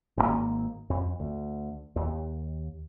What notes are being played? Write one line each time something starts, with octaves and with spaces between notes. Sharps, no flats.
G#1 C#3 A#3
F2
D2
D#2